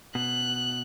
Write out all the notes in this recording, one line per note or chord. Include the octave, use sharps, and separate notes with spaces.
B2 F#6